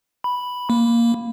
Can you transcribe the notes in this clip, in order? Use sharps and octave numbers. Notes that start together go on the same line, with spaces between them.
B5
A#3